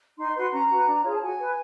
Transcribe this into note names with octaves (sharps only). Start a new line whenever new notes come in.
D#4 C6
F#4 B4 C6
C#4 A#5
F#4 B4
D4
F4 G#4 C#5
A5
F#4 G#5
B4